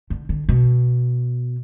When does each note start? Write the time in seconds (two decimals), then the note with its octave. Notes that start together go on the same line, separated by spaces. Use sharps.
0.10 D3
0.29 D3
0.49 B2